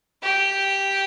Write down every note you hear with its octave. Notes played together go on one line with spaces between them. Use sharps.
G4